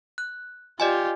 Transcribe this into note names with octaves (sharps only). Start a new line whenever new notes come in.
F#6
F4 G4 D5 D#5 G#5